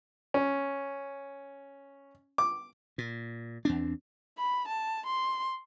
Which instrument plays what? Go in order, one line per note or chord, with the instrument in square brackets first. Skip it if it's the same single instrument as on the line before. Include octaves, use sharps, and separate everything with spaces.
[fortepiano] C#4
D6
[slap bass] A#2
E2 C4 D4
[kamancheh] B5
A5
C6